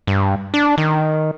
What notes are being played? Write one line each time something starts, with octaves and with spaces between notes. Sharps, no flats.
G2
D4
D#3